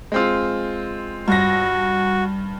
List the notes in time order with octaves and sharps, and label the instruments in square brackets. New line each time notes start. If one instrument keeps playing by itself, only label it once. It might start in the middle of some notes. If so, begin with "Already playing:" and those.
[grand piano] G#3 C4 F4
[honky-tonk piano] G2 A#6 [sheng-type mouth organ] F#4